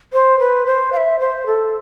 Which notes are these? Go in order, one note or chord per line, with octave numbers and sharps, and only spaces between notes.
C5
B4
C5
F5
E5
C5
A4